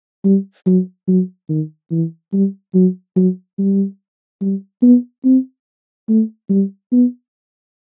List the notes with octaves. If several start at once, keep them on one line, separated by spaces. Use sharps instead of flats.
G3
F#3
F#3
D#3
E3
G3
F#3
F#3
G3
G3
B3
C4
A3
G3
B3